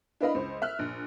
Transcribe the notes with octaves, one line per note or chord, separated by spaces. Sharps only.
D4 E4 B4 D#5 F5 B5
C#2 C5
E5 F6 F#6
A#1